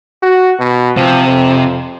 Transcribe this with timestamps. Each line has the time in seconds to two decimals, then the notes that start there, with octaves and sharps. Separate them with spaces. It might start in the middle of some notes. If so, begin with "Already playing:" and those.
0.23 F#4
0.59 B2
0.97 C3 F3
1.28 F2